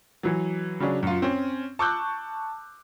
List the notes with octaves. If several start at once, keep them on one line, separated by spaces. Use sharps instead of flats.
E3 F#3
C#3 F#3 C#4 D4
F#2 F4
C4 C#4
A5 C#6 D6 E6 F#6 G6